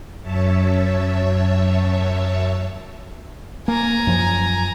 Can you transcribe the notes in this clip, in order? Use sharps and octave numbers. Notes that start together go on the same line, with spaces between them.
F#2 C#5 E5 A5
A#3 G#5 A#5
F#2 F3